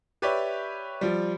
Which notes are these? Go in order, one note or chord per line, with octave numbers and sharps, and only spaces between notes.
G4 B4 C#5 D5 E5
F3 G3